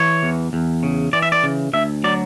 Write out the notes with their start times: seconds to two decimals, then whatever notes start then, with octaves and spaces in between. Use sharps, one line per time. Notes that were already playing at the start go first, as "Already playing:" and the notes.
Already playing: E3 C#5
0.23 E2
0.53 E2
0.83 C#3
1.13 E3 D5
1.22 E5
1.32 D5
1.43 C#3
1.73 D2 E5
2.04 F#3 D5